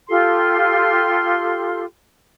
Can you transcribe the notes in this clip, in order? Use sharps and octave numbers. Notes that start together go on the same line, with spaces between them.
F4 G4 A4 C6